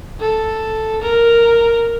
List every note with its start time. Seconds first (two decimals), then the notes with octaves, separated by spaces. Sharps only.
0.21 A4
1.02 A#4